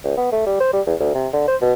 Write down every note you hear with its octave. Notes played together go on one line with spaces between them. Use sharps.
C#2
B3
A3
G3
C5
G3
E2
D2
C3
D3
C5
B2